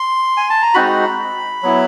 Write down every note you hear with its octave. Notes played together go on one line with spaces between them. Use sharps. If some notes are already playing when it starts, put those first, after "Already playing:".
Already playing: C6
G#5
A5
A#5
G#3 C4 D#4 F#4 B5
F#3 B3 E4